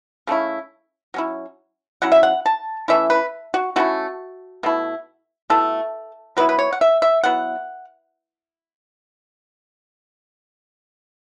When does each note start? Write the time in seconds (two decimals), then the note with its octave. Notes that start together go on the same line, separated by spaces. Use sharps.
0.27 C#3 A3 C#4 E4
1.14 F#3 C#4 E4
2.02 F#3 C#4 E4 F#5
2.12 E5
2.23 F#5
2.46 A5
2.88 E3 A3 C#4 E4 E5
3.10 B4
3.54 F#4
3.76 E3 A3 C#4 E4 F#4
4.63 B2 A3 E4
5.50 B2 A3 E4 A4
6.37 F#3 B3 E4 B4
6.49 B4
6.59 C#5
6.73 F#5
6.81 E5
7.02 E5
7.24 F#3 B3 E4 F#5